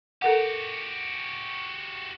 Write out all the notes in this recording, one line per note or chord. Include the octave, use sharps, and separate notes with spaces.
F#4 G4 A4 A#4 F#5